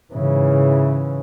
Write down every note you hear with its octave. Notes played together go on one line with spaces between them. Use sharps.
G#2 C#3 E3